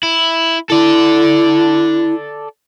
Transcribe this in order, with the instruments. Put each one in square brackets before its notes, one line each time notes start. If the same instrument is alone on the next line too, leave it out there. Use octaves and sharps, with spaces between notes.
[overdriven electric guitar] E4
[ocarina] E4 [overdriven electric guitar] A4 D5